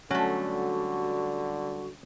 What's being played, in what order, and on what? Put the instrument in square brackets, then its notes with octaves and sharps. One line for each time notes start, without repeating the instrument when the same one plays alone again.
[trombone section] D3 G3 [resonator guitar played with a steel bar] F#3 A3 [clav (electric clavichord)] C#4 [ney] F#4